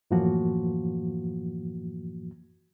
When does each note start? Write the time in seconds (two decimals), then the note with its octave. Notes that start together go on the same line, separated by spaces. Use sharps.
0.11 F#2 A2 E3 F3 A#3 F#4